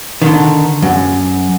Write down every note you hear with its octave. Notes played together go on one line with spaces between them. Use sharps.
D3 D#3
F#2